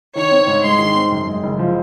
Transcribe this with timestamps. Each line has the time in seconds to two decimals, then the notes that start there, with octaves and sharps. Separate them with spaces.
0.16 D#3 C#5
0.31 C4
0.47 G#2
0.63 G#3 C6
0.79 D#3
0.95 C4
1.12 F#2
1.27 G#3
1.43 F#1
1.59 F3